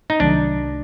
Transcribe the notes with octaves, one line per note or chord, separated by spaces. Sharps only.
D#4
C2 C3 D#3 F#3 A3 D4